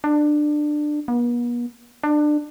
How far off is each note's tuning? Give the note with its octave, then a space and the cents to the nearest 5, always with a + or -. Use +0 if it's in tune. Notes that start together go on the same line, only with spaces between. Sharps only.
D4 +20
B3 -45
D4 +25